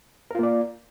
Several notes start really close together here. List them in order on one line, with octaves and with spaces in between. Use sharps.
A#4 F4 A#3 D5